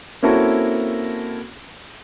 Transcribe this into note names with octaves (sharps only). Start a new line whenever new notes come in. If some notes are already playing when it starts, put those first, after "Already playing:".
A#3 C4 C#4 E4 F#4 A4